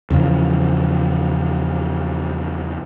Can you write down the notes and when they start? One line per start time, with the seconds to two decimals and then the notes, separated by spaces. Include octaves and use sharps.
0.10 E2 C#3 F3